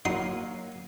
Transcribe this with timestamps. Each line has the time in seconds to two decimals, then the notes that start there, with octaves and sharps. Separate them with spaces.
0.05 F#3 A#3 D#4 F#5 C6